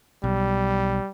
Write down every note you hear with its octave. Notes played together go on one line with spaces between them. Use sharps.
B1 G3